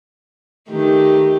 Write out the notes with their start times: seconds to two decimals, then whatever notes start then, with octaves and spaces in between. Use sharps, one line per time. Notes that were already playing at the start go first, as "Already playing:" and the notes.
0.70 D#3 A3 G4